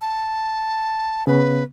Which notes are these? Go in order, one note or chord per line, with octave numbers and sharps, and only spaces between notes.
A5
C#3 B3 B4